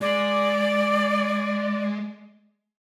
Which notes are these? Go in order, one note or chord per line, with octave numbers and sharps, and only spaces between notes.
G#3 D5